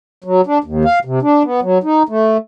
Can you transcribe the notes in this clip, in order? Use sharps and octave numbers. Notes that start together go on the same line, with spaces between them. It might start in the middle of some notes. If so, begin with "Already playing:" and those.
F#3
D4
D#2
F5
C3
D4
B3
F#3
D#4
A3